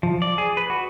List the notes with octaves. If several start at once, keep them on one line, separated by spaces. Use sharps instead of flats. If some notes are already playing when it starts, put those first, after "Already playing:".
F3
D5
G#4
B4
F#4